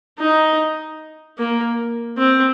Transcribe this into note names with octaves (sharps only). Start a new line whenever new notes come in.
D#4
A#3
C4